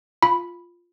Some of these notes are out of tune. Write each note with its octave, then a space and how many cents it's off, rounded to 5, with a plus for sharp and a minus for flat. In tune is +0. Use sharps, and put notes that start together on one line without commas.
F4 +0 B5 -5